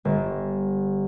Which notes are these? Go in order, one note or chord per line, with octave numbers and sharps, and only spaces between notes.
G1